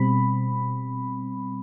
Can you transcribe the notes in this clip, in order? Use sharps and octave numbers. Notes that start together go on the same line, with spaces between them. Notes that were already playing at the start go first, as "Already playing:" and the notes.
Already playing: B2 G3 C4 B5